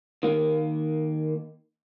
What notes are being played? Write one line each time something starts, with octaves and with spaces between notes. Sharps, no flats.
D#3 A#3